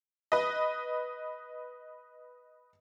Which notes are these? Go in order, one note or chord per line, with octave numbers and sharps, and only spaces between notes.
B4 D#5